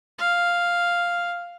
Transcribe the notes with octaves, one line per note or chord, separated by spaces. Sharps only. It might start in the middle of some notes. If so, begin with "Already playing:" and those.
F5